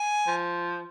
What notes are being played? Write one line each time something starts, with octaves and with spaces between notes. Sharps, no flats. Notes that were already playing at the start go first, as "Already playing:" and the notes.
Already playing: G#5
F3